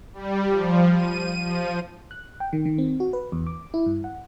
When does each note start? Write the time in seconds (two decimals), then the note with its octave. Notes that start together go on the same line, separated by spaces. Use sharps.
0.14 G3
0.50 F3
0.97 D#7
1.44 F3
2.11 F#6
2.40 G5
2.53 D#3
2.66 D#3
2.78 C4
3.00 F#4
3.13 B4
3.32 E2
3.47 D6
3.74 E4
3.86 G2
4.04 F#5